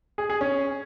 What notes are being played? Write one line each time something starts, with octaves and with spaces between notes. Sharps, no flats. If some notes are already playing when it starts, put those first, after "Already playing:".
G#4
G#4
C#4